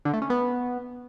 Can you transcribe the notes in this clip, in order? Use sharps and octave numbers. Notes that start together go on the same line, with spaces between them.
D3
A3
C#4
B3